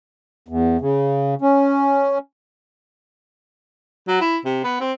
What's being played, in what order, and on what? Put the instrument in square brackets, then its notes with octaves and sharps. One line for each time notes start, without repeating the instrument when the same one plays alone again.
[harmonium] E2
C#3
C#4
[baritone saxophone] F#3
E4
C3
B3
C4